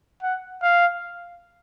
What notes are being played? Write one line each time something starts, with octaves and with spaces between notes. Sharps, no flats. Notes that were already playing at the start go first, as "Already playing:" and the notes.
F#5
F5